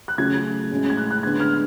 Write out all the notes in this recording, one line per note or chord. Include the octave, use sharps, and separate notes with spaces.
F#6
C#3 F#3 A3 C#4 G#6
A2 G#3 C#4
G#6
F#6
F#6
D3 G#3 B3 D4 G#6
F6